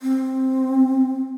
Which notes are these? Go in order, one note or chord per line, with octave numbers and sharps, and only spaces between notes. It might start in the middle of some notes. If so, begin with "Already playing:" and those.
C4